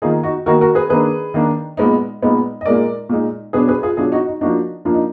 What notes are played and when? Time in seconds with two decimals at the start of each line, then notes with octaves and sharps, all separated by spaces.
0.02 D#3 A#3 D#4 F4 G#4
0.23 D#4 F#4
0.46 D#3 A#3 D#4 F#4 A#4
0.61 F#4 A#4
0.75 G#4 B4
0.90 D#3 A#3 D4 G#4 B4
1.34 D#3 A#3 D4
1.77 A#2 G#3 B3 D#4
2.22 A#2 G#3 B3 D#4
2.61 D#5
2.66 A#2 G#3 D#4 A#4 D5
3.09 A#2 G#3 D#4
3.53 B2 F#3 D4 G#4 B4
3.68 G#4 B4
3.83 F4 G#4
3.97 B2 F#3 D4 F4 G#4
4.12 D#4 F#4
4.27 D#4
4.41 F3 A#3 D4 D#4 F#4
4.85 F3 A#3 D4 F4
4.94 D#4